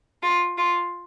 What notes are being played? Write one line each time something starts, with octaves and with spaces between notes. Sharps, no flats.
F4
F4